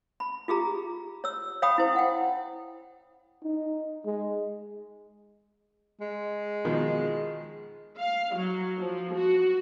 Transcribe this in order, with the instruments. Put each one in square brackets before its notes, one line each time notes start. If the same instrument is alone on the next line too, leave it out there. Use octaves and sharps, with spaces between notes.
[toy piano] B5
F4 G4 G#4 A#5
C#5 E6
C#5 F5 G5 B5 D#6
E4 C5
F#5 G5
[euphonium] D#4
G#3
[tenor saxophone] G#3
[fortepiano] B2 D#3 F3
[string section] F5
F#3
F3
F#4